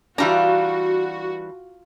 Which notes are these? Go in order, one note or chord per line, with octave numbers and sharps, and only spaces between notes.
E3 G3 D4 F4 F#4 A#5